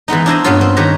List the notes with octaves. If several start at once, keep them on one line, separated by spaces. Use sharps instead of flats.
E3 G#3 B3 D#4
D4 E4 C5 D#5
G2 A#2 B3 C#4 F4
C4
D#3 G4 B4 C#5 A#5